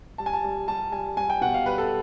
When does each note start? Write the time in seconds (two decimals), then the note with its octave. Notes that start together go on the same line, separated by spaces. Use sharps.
0.18 G3 A5
0.26 G#5
0.33 A5
0.44 G3
0.68 G3 A5
0.92 G3 G#5
1.17 G3 G#5
1.30 G5
1.41 B2 F#5
1.54 F5
1.66 G3 B4
1.78 A4